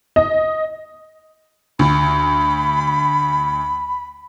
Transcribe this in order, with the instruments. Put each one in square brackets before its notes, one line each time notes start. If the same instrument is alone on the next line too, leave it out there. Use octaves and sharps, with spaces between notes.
[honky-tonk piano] D#5
[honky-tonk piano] D2 [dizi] B5